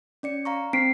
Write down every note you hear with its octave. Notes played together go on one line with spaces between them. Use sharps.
C#4 D5 C#7
F5 A#5 C#6
C4 B6 C7 D7